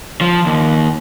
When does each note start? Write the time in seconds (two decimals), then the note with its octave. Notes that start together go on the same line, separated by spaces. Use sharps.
0.21 F3
0.46 D#2